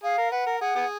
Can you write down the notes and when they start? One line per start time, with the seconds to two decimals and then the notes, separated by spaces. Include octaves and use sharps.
0.03 G#4 F5
0.18 A#4
0.31 B4 F#5
0.47 A#4
0.60 G#4 F#5
0.76 B3 G#4